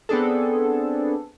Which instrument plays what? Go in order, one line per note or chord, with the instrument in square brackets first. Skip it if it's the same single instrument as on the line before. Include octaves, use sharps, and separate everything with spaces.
[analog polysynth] B3 C4 D4 G#4 A4